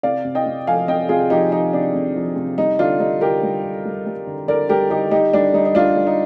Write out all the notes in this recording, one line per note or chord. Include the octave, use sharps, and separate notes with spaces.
C3 D5 F5
C3
D#5 G5
C3
F3 F5 G#5
C3 D#5 G5
C3 F4 G#4
F3 D#4 G4
F3 D#4
C3 D4
C3
F3
C3
G3 D#4
D3 D4 F4
G3 D#4
D3 G4 A#4
G3
D3
G3
G3
D3
D3 A#4 D5
G3 G4 A#4
D3 D#4 G4
G3 D#4 G4
G3 D4
G3 D#4
D#4
G3 D4 F4
G3
D#4